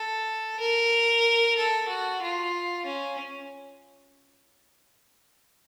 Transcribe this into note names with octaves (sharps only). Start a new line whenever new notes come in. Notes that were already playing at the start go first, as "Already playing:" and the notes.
Already playing: A4
A#4
A4
F#4
F4
C#4